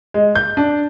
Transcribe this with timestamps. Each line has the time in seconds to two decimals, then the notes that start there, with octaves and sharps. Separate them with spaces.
0.14 G#3
0.35 G6
0.57 D4